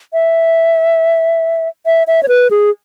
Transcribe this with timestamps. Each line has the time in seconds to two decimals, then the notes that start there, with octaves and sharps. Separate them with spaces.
0.13 E5
1.86 E5
2.07 E5
2.23 C#5
2.28 B4
2.51 G#4